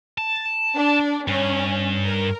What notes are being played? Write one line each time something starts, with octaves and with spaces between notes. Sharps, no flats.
A5
D4
G2 C#4
A#4